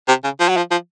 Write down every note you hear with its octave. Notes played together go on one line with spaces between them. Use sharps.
C3
C#3
F3
F#3
F3
F3